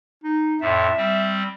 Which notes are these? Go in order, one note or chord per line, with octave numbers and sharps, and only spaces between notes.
D#4
F2 A2 E5
G3 C4